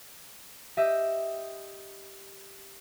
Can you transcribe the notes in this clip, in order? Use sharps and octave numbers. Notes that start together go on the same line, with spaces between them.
G4 D#5 E5